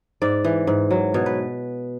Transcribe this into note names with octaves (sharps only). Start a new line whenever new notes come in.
G#2 D5
E3
G#2
F#3
B2 C#5
B4